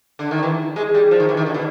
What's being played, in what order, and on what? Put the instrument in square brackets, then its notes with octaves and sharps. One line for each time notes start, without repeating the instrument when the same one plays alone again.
[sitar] D3
D#3
E3
G#3
G3
F3
D#3
E3
D#3
D3
B2